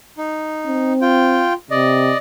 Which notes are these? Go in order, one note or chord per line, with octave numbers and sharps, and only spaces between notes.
D#4
C4
F4 G5
C3 D5 D#5